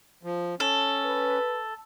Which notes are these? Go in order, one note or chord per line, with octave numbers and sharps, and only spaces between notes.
F3
C#4 A4
B4